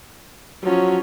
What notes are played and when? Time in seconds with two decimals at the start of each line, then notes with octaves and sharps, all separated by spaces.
0.63 F3 F#3 C#4